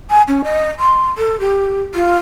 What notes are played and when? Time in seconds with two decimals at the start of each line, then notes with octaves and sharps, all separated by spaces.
0.10 G#5
0.28 C#4
0.44 D#5
0.79 C6
1.17 A4
1.40 G4
1.94 F4